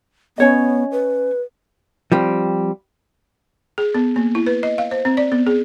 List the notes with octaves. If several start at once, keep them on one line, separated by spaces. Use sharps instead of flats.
B3 C#4 C#5 D#5
B4
F3 G3 C4
G#4
B3
A#3
E4
B4
D#5
F5
C5
C4
D5
B3
G#4